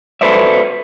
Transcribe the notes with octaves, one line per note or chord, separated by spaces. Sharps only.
F#4 A4 B4 C5 D5 E5